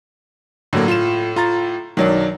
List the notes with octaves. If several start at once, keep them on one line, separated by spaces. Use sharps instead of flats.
A2 D3 F#3 A#3
F4 E7
F4 A#5 A6
B1 D#3 F#3 D4